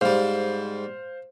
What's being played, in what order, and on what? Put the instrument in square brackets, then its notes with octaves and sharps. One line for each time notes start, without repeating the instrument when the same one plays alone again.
[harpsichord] G#2 G3 [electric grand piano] C5 F5